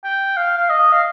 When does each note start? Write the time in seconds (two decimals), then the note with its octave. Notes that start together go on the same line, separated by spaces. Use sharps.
0.04 G5
0.37 F5
0.58 F5
0.69 D#5
0.92 F5